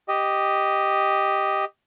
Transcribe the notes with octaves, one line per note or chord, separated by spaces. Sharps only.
G4 D#5